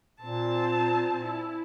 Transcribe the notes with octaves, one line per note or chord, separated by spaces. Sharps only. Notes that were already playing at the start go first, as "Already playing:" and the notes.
A#2 C4 A5
E4